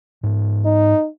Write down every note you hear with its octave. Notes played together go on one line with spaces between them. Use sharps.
G#2 B3
D#4